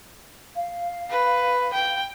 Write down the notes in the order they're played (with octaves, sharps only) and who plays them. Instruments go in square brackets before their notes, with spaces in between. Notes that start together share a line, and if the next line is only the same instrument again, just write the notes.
[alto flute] F5
[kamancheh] B4
G5